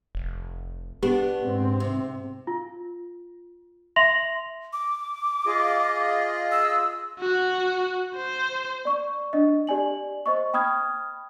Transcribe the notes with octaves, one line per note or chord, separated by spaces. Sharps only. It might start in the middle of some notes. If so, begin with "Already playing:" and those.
F1
B3 D4 G4
G#2 C4
C3
F4
E5 C6 A#6 F7 F#7
D6
F4 G#4 D#5
E6
F#4
C5
D5 C#6
D4 D#5
G4 D5 G#5 F#7
C5 D#5 C#6
G5 B5 D#6 F6 G#6